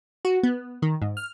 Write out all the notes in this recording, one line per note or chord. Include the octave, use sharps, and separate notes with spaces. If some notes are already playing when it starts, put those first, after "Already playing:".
F#4
B3
D#3
G#2
F6